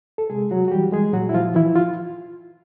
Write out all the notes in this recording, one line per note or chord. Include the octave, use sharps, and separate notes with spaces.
A4
C3 G#3 G#4
F#3 F#4
F#4
E3 G3 G4
G#3 G#4
A#2 F#3 F#4
E4
F3 F4
E3 F3 E4
F4